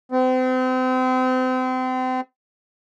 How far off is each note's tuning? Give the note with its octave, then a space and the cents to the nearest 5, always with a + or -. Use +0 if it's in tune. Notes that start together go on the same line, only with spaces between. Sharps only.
C4 -35